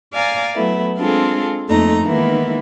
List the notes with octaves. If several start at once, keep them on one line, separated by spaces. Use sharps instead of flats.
D5 F5 G#5 A#5
F#3 A3 B3 E4
G#3 C4 D4 F4 G#4 A4
F2 A3 A#3 D#4 A#5
D#3 E3 G#3 A#3 B3 E4